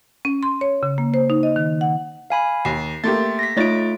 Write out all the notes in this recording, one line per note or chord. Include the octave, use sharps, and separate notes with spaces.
C#4
C6
C#5
C#3
A#3
C5
D#4
D#5
D#3
F#5
F5 G#5 B5
D#2 C7
A3 A#3 G4 E5 C6 A6
A#6 B6
A3 D#4 F4 C#5 A6 D7